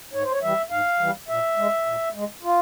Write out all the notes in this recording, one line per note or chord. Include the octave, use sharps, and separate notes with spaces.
G#2 C#5
C5
C#5
E3 G3 E5
G#2 F5
E3 G3
A#2 E5
G#3
A#2
G#3
F4